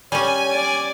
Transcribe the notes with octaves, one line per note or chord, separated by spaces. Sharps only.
G3 C#4 C#5 G#5
D5